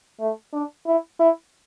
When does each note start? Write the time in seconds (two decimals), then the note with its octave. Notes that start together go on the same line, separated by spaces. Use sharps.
0.20 A3
0.53 D4
0.86 E4
1.19 E4